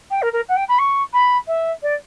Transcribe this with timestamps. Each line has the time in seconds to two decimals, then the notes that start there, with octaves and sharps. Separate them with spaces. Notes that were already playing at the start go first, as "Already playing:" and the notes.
0.11 G5
0.22 A#4
0.33 A#4
0.49 F#5
0.57 G5
0.69 B5
0.79 C#6
1.13 B5
1.48 E5
1.83 D5